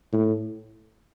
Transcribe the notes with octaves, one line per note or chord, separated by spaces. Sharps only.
A2